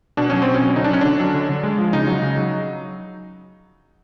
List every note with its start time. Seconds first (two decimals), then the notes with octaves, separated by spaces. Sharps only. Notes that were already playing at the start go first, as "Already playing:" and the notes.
0.17 B2 D4
0.30 F#3 C#4
0.42 C4
0.47 B2
0.54 C#4
0.61 F#3
0.76 D3 D#4
0.84 D4
0.90 F#3 C#4
1.01 D3 D4
1.20 F#3
1.34 D3
1.49 D3
1.63 G#3
1.78 F3
1.93 C#3 D#4
2.07 F#3
2.22 C#3
2.37 F#3